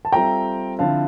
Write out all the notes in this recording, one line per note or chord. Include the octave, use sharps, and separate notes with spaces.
A5
G3 C4 F4 A4 E5 G5 A#5
D3 F3 C4 E4 F5 A5